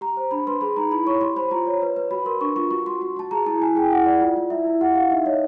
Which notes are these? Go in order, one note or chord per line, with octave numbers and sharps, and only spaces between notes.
G4 A#5
C5
D4 B5
B4 C6
G#4 B5
D#4 A#5
E4 B5
C#5 C#6
G4 C6
C5 B5
F4 A#5
C#5
B4
B4
F#4 B5
A#4 C6
D4 C#6
F4 C#6
F#4 C#6
F#4 C6
F#4
F#4 A5
G#4 A#5
E4 A5
E4 G#5
G#4 G5
E4 F#5
D5
F4
F4
E4 E5
E4
G4 F#5
G4 F5
D#4 E5
C#5 D#5